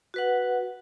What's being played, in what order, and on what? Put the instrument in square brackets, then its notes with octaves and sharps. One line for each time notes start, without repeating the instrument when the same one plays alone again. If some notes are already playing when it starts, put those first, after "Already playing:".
[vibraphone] F#4 B4 F#5